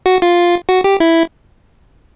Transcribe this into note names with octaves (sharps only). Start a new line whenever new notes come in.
F#4
F4
F#4
G4
E4